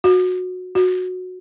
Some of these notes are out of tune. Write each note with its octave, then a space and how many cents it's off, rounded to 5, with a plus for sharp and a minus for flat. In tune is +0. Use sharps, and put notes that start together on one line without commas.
F#4 -20
F#4 -15